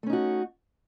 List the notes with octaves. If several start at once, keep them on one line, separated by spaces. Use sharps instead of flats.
A3 C#4 D#4 F#4